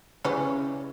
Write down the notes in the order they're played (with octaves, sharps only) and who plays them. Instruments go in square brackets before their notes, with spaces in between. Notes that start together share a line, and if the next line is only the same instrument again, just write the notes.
[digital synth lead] C#3 [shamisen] E3 G3 C#4